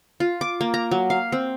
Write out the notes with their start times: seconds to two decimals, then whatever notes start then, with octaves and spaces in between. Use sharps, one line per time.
0.20 F4
0.41 D6
0.61 A#3
0.74 A#5
0.91 F#3
1.10 F5
1.32 C4